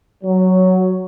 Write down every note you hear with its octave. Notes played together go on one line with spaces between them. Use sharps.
F#3